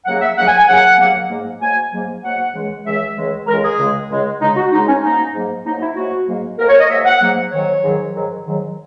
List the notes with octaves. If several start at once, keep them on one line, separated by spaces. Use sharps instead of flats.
D#2 C#3 F#3 A#3 F#5
E5
D#2 C#3 F#3 A#3 F#5
G#5
G#5
D#2 C#3 F#3 A#3 F#5
D#2 C#3 F#3 A#3
G#2 F#3 A#3
G#2 F#3 A#3 G#5
G#2 F#3 A#3
G#2 F#3 A#3 F#5
C#2 C#3 E3 G#3
C#2 C#3 E3 G#3 E5
C#2 C#3 E3 G#3
C#2 C#3 E3 G#3 A#4
G#4
C#2 C#3 G#3
C#2 C#3 G#3
C#2 C#3 G#3 D#4
F#4
C#2 C#3 G#3 D#4
C#4
G#2 F#3 A#3 D#4
G#2 F#3 A#3
G#2 F#3 A#3 D#4
E4
G#2 F#3 A#3 F#4
G#2 F#3 A#3
G#2 F#3 A#3 A#4
C#5
D#5
G#2 F#3 A#3 E5
F#5
G#2 F#3 A#3
G#2 D#3 F#3 C#5
G#2 D#3 F#3
G#2 D#3 F#3
G#2 D#3 F#3